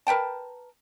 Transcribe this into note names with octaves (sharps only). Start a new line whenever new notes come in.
A#4 B4 G5 A5